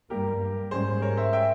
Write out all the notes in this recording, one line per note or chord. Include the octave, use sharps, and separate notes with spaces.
G2 G3 A#3 G4 A#4
G#2 G3 C#4 G#4 C5
A#4 C#5
C5 E5
E5 G5